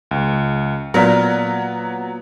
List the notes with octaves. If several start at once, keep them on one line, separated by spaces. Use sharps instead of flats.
C#2
A#2 F#3 B3 A#4 A#5 B6